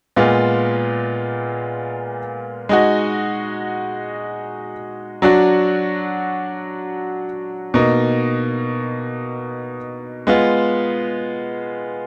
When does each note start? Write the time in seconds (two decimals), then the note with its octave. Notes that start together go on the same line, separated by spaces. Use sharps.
0.16 A#2 G#3 B3 F4
2.69 G#3 D#4 F#4
5.22 F#3 D4 F#4
7.74 B2 A#3 D#4
10.27 G#3 B3 F4